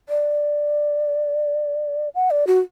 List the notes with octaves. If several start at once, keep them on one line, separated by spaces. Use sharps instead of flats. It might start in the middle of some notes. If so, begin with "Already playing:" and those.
D5
F#5
D5
F#4